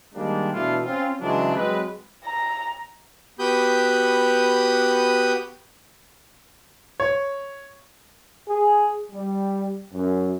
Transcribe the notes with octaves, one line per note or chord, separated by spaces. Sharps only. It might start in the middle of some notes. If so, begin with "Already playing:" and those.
D#3 G3 G#3 A#3 C4 D4
B2 E3 A3 D4 E4 F4
C4 C#4 F4
C#3 E3 F#3 G#3 A3 D4
F#3 G#3 C4 B4
A#5
B3 F#4 G4 B5 D#6 G6
C#5
G#4
G3
F#2